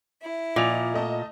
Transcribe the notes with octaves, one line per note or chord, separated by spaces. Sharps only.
E4
A#2 F3 D#5 F7
A3 D#5 A5